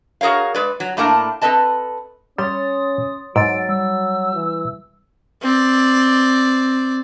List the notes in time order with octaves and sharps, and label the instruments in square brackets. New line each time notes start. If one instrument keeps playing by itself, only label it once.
[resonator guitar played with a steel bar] F#4 G#4 A#4 C#5 F5
G#3 B4 D5
F#3
A2 A3 A#3 D4 A#4 A5
C4 A4 B4 D#5 A5
[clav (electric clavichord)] G3 [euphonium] C#4 [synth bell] C#5 C6 A6 [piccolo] D#6
[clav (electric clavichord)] G#2 [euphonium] F#3 [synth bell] E6 A6 [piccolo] D7
[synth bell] G3 [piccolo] E6
[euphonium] E3
[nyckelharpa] C4 D5